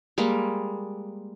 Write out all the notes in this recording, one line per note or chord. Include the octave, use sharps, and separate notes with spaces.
G3 G#3 A#3